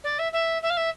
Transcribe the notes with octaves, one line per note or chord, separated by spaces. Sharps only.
D5
E5
E5
E5
F5
E5